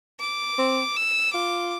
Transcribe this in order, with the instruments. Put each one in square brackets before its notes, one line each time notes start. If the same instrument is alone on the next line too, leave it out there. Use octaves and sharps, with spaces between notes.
[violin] D6
[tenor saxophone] C4
[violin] E6
[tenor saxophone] F4 [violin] D6